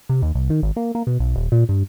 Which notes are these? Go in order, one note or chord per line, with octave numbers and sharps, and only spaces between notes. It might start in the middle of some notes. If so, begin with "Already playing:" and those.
C3
D#2
C2
D#3
G#1
A#3
A#3
B2
B1
D#1
A#2
G2